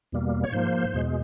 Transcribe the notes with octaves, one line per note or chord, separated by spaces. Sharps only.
E2 B2 G3 A#3
C#5
G#2 F3 A#3 C5
E2 B2 G#3